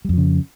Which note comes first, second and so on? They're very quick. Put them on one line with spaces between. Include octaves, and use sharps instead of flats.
G3 F2 F3 C#3